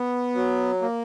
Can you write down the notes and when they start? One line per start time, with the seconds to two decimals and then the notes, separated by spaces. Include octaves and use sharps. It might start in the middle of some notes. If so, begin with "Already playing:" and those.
Already playing: B3
0.35 F#3
0.82 A#3